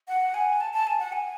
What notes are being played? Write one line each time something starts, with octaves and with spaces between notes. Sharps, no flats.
F#5
G#5
A5
A5
G#5
F#5
G#5